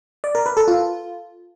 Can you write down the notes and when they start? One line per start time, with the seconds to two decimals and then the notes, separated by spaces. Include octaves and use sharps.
0.24 D5
0.35 A#4
0.46 B4
0.57 A4
0.68 F4